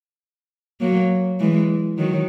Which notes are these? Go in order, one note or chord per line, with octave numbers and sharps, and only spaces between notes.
F#3 A#3
E3 G#3
D#3 F#3